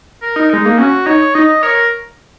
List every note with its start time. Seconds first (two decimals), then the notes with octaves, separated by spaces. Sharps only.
0.22 A#4
0.36 D#4
0.50 G#3 D#4
0.65 A#3
0.78 C#4 F#4
1.06 D#4 C#5
1.34 D#4 D#5
1.63 A#4 C#5